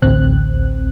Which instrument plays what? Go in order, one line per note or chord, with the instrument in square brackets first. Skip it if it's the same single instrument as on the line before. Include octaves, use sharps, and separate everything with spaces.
[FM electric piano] A1 D2 C4 F#6